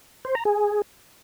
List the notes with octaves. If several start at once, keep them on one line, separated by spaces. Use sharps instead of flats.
C5
A#5
G#4